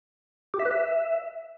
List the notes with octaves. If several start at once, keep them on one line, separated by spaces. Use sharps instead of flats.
G4
E5
B4
E5